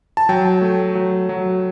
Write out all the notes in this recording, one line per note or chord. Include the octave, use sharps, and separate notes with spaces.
A5
F#3 G5
A3
F#3
F#3